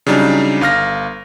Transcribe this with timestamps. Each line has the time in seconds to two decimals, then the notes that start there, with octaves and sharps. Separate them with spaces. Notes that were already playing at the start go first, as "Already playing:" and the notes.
0.06 C#3 F#3 G3 D4 D#4
0.61 G1 F5 F6 A#6